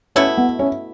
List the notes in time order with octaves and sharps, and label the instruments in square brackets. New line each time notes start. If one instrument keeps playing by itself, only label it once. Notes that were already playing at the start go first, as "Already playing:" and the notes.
[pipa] B2 A3 E4 [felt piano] C#4
[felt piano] B3
C#4